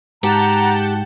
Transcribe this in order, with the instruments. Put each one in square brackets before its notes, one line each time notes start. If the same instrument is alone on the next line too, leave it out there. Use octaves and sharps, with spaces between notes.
[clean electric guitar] G#2 [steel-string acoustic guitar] G4 [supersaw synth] F#5 A5 G6 [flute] A#5